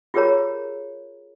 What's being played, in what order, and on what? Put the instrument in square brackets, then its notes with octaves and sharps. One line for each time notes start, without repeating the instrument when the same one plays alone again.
[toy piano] F4 G4 G#4 A#4 C#5 A#5